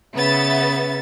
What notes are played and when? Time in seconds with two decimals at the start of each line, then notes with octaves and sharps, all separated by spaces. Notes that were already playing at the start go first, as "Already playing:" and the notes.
0.16 C#3 B3 E5 A6